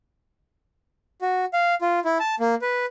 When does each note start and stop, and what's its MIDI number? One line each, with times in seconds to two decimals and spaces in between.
1.22 1.45 66
1.53 1.75 77
1.82 1.99 65
2.05 2.18 64
2.20 2.35 81
2.40 2.55 58
2.62 2.86 71